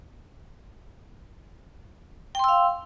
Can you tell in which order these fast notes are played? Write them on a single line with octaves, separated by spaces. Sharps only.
G5 C6 E6 F5